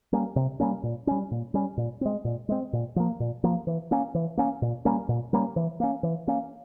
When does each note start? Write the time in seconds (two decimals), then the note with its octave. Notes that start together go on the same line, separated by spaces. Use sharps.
0.13 G3 A#3 C#4
0.36 C3
0.60 G3 A#3 C#4
0.83 A#2
1.07 G3 C#4
1.31 A#2
1.54 G3 C#4
1.78 A#2
2.01 G#3 C4
2.25 A#2
2.49 G#3 C4
2.73 A#2
2.96 F3 A#3
3.20 A#2
3.44 F3 A#3
3.67 E3
3.91 A#3 C#4
4.15 E3
4.38 A#3 C#4
4.62 A#2
4.85 G3 A#3 C#4
5.09 A#2
5.33 G3 A#3 C#4
5.56 E3
5.80 A#3 C#4
6.03 E3
6.27 A#3 C#4